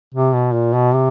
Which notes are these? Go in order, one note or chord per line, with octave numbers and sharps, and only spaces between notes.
C3
B2
A#2
B2
C3